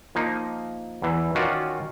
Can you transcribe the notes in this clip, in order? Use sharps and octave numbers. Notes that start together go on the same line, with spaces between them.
F3 A#3 D#4
E2 E3
D#3 C#4 F4 F#4 D5